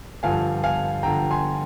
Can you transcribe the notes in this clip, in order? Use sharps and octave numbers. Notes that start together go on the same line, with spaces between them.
G2 D3 F3 F5 G#5
F5 G#5
G2 D3 F3 G5 A#5
G#5 C6